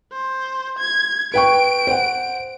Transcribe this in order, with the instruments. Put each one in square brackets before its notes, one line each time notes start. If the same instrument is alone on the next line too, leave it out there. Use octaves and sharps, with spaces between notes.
[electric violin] C5
G#6
[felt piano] B4 G5 C#6 [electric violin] D7
[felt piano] C5 F#5